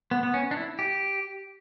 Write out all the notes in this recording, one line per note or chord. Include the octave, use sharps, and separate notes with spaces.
B3
B3
C#4
D4
E4
G4